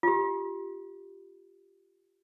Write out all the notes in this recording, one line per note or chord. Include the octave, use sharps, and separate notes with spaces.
F4 G4